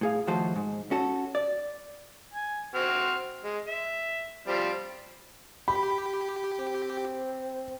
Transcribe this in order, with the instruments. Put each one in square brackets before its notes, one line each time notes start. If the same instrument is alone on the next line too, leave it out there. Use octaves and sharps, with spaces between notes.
[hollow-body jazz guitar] A2 G#4 F5
D#2 F3 A3 F#4 C5 A5
G#2
C#4 F#4 A4
D5
[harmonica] G#5
C4 F#4 F6
G#3
E5
F3 G3 C4
[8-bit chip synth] G4 [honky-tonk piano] B5
[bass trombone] C4